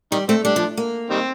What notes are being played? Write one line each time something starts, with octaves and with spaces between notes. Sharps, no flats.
D#3 G3
A3 C4
G3 D4
F3
A#3
D#3 G3 C4